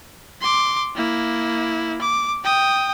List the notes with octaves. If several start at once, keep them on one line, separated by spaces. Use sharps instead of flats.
C6 D6
A#3 E4
D6
G5 D#6